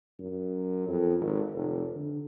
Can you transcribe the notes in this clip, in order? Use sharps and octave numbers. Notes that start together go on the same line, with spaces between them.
F#2
F2
G#1
F1
D3